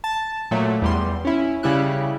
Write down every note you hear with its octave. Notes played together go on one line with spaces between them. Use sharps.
A5
A#2 F#3 A3
E2 G3 C6
C#4 E4
C#3 G3 E4 F#6